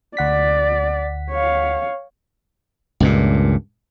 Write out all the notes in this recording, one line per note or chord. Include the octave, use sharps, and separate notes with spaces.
D2 D5 F#5 B6
C#5 F5
C#2 G2 A#2